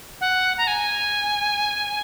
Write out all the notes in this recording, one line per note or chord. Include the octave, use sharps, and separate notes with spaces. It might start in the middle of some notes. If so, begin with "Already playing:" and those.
F#5
A#5
G#5